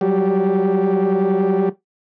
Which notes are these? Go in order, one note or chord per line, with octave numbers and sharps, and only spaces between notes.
F#3 G3 G4